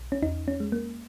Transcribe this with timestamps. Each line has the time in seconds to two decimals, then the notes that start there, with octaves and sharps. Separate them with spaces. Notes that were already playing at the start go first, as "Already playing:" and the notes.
Already playing: B1
0.12 C#4
0.22 E2 D#4
0.48 C#4
0.60 G#3
0.72 A#3